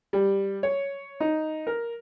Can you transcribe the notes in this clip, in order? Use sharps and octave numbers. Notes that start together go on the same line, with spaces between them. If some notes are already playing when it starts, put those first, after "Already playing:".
G3
C#5
D#4
A#4